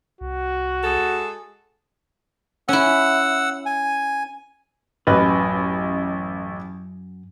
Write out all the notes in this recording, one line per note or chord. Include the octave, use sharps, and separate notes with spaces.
C2 F#4
G#3 G#4 A4
C#4 E4 F#5 E6
G#5
A1 F#2 B4 D#5